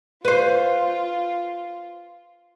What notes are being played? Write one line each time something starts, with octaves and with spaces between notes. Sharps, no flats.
F4 B4 C5